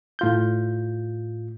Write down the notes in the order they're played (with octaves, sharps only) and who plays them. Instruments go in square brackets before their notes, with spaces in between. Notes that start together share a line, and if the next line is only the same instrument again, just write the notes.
[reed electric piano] A2 F4 G6